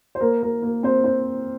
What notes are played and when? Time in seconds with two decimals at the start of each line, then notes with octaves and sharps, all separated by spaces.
0.15 C5
0.21 A#3 A#4
0.43 A#3 A#4
0.62 A#3 A#4
0.83 C4 C5
1.04 C4 C5